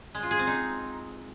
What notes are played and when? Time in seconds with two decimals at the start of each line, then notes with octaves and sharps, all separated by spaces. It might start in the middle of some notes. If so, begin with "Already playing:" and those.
0.15 G#3
0.23 F4
0.31 G#4
0.39 C4
0.47 D#4